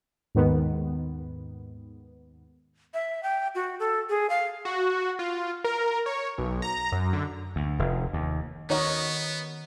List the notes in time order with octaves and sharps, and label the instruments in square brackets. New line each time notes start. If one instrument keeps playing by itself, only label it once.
[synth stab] D#2 G#2 D#3 B3
[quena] E5
G5
F#4
A4
G#4
F5
[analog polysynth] F#4
F4
A#4
C#5
B1
A#5
F#2
D3
[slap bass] D2
F1
D#2
[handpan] D#3 C#5 D#5 [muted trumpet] B3 [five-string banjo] D#4 F#4 A#4